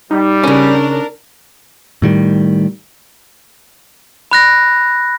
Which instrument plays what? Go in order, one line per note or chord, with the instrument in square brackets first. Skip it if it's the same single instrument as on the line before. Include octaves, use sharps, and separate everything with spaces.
[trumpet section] G3 [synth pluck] D#4
[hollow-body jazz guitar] C#3 C#4 [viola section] D4 A#4
[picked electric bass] A2 D#3 G3
[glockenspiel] B5 F#6 A#6